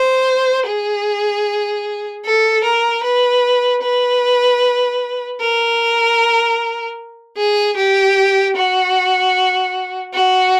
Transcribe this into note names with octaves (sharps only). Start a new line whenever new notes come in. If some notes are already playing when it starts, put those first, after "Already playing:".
Already playing: C5
G#4
A4
A#4
B4
B4
A#4
G#4
G4
F#4
F#4